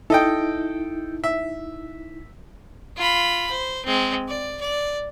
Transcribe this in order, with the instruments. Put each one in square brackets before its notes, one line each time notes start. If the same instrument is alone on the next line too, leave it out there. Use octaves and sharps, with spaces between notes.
[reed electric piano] D#4 E4 [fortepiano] A4 D#5 G5
[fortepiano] E5
[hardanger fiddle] F4 B5
C5
G#3 C4
D5
D5